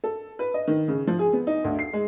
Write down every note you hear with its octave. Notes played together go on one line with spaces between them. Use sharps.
A4
B4
D#5
D#3
C#3
F3
G#4
B3
D#4
D2
C7
G#3